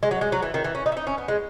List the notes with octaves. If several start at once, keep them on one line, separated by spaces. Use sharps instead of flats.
G#3
F#3
G#3
F#3
E3
D#3
E3
C#4
D#4
E4
D#4
C#4
B3
G#3